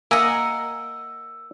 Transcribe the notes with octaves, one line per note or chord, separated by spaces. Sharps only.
A#3 A#4 D#5 E5 F#5 G#5 E6